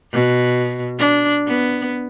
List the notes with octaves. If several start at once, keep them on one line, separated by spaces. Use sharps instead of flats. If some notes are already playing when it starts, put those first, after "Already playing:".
B2
D4
B3